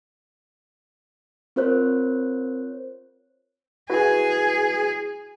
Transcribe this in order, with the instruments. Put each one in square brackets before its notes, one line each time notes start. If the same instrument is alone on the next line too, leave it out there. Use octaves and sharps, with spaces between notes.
[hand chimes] C4 F4 A#4 C5 C#5 F#6
[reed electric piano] E4 F#4 B4 [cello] G#4